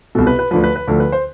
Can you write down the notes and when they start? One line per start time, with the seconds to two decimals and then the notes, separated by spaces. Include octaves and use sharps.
0.15 C2 B2 A4
0.27 B4
0.39 B4
0.51 D2 D3 F3 B4
0.64 B4
0.76 B4
0.88 D2 D3 F3 A4
1.00 B4
1.12 C5